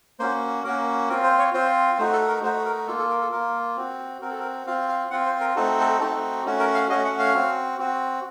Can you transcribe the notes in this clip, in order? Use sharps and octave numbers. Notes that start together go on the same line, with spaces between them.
A#3 C#4 F#4 C5
A#3 C#4 F#4 A#4
C4 F4 A#4
C5
C#5
C4 F4 C5
A3 D#4 F#4 C5
A4
A#4
A3 D#4 F#4 C5
A#4
A#3 F4 A4
A4
A#4
A4
A#3 F4 A#4
C4 F#4
C4 F#4 A#4
A4
A#4
C4 F4 F5
F5
C4 F4 F#5
C5
A#4
A3 C4 D#4 F#4 A4
A4
A3 C4 D#4 F#4 A4
A3 C#4 F#4
A#4
F5
A3 C#4 F#4 D#5
F#5
F5
C4 F#4
C4 F#4